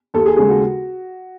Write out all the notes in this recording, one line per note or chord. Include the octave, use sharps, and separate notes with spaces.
D#2 A4
G#4
C#3 G#3 G#4
F#4